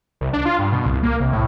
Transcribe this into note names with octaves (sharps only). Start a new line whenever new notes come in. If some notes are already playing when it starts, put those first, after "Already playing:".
C2
D4
F4
G2
B2
C2
A#3
C2
A2